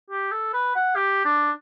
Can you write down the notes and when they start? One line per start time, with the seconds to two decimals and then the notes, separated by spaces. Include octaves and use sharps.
0.10 G4
0.31 A4
0.53 B4
0.75 F#5
0.95 G4
1.25 D4